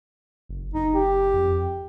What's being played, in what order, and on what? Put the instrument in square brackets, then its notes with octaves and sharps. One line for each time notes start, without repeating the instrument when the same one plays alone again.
[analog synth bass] F#1
[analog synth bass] F#1 [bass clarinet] D#4
[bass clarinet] G4
[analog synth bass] F2